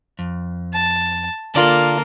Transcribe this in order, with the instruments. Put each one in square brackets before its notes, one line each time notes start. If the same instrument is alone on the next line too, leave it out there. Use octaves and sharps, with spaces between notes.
[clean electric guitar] F2
[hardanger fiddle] A5
[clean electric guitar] D3 A4 [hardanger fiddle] A#3 A#4 [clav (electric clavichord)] F4 D5 A5